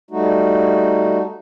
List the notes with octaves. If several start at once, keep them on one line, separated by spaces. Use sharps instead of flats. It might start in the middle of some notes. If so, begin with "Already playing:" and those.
G3 A3 D#4 F#4